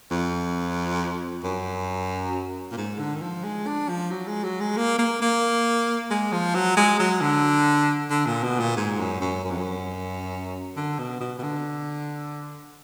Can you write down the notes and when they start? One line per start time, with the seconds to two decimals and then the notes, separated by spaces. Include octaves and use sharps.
0.11 F2
1.44 F#2
2.71 A#2
2.78 G#2
2.99 D3
3.16 D#3
3.22 F3
3.43 G#3
3.67 D4
3.89 F3
4.11 F#3
4.27 G#3
4.44 F#3
4.60 G#3
4.77 A#3
4.99 A#3
5.22 A#3
6.10 G#3
6.32 F3
6.55 F#3
6.77 G#3
6.99 F#3
7.21 D3
8.10 D3
8.26 A#2
8.43 B2
8.59 A#2
8.77 G#2
8.99 F#2
9.21 F#2
9.44 F#2
9.51 F2
9.57 F#2
10.76 D3
10.99 B2
11.20 B2
11.39 B2
11.43 D3